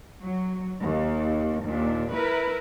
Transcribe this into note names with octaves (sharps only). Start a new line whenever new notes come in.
F#3
D#2
D#2 A#2 D4
E4 A#4 B4